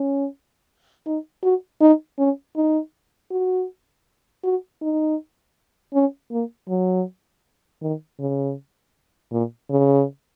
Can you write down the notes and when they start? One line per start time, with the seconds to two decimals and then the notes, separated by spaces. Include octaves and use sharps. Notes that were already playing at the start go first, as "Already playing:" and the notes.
Already playing: C#4
1.06 D#4
1.43 F#4
1.81 D#4
2.18 C#4
2.56 D#4
3.31 F#4
4.44 F#4
4.81 D#4
5.94 C#4
6.31 A#3
6.68 F#3
7.82 D#3
8.19 C#3
9.32 A#2
9.70 C#3